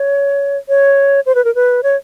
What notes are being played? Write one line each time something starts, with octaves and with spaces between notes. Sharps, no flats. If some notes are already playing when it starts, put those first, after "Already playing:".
Already playing: C#5
C#5
C5
B4
A#4
B4
C#5